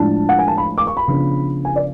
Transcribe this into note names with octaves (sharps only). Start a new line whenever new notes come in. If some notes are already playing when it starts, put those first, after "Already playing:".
Already playing: A2 F3 G#3 D4 A5
F#5
G#5
A5
B5
D6
C#6
B5
C#3 F3 B3 D4
G#5
D5